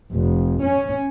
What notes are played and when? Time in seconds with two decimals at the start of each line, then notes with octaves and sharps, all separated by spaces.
0.12 F1
0.63 C#4